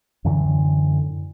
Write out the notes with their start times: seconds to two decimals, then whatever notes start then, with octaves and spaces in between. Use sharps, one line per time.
0.25 F#2 A2 D3 E3